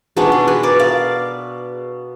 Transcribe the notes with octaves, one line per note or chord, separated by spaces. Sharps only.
B2 G#3 B3 D4 D#4
D4
G#4 B4
A#4 D5
D5 F5